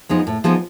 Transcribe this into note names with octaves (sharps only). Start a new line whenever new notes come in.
F3 G#3 B3 D#4
A2
F3 G#3 B3 D#4